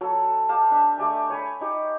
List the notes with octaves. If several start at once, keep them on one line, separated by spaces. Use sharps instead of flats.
F#3 A4
G4 F5 A5
D4 E5
A3 G4 D5 G#5
C#5 G#5 B5
D#4 G4